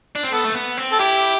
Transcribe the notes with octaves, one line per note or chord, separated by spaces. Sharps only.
D4
C4
B3 A4
A3
B3
C4
A4
E4 G4